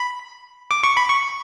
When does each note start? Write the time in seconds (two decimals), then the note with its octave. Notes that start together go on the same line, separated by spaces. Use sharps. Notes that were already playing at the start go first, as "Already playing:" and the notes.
Already playing: B5
0.71 D6
0.83 C#6
0.96 B5
1.09 C#6